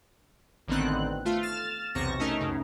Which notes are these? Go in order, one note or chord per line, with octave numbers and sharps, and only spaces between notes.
A1 D3 D#3 B3 C4 F#6
A3 F4
F6 A6 E7
B1 E2 C3 C#6 A#6
A3 C#4 D#4 A#4
C#2 F#2 C#3